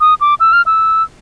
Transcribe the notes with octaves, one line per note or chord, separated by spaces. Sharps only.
D#6
D6
E6
F6
E6